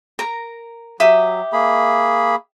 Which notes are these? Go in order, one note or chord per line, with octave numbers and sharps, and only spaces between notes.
A#4 A#5
F#3 G4 E5 D#6
A#3 G#4 B5